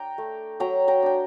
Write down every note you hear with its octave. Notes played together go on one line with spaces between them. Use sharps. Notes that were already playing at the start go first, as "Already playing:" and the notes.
Already playing: D4 G5 A#5
A3
F#3 G5 A#5
G5 A#5
D4 G5